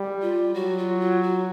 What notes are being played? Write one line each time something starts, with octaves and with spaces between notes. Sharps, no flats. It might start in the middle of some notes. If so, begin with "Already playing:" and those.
Already playing: G3
F4
F#3 F#4
F4
F4
F#4